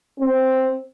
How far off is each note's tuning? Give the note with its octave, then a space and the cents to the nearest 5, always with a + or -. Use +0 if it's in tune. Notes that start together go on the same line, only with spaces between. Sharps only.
C4 +0